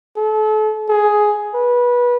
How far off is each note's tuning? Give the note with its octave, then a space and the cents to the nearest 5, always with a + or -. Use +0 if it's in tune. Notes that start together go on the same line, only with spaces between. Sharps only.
A4 -35
G#4 +10
B4 -20